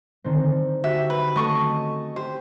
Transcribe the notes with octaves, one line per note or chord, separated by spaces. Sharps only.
D3 D#3 C4
F#4 G4 E5
B4
A3 C#4 A4 D#5 C#6
G4 C5